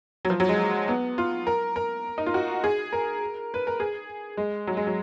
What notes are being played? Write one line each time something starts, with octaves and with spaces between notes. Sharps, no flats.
F#3
F3
F#3
G#3
B3
F4
A#4
A#4
D#4
F4
F#4
G#4
A#4
B4
A#4
G#4
G#3
F#3
G#3
F#3